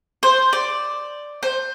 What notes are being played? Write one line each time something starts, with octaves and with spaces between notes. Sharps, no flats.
C5
D5
C5